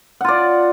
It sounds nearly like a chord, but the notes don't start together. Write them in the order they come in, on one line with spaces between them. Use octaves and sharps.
F#5 F4 D5